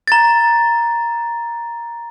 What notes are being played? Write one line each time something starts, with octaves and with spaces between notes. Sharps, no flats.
A#5 A6